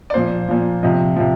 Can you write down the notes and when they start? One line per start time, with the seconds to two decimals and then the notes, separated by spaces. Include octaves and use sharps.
0.10 D5
0.14 A#2 F3 C5
0.49 A#2 F3
0.83 C3 F3 D#5
1.16 C3 F3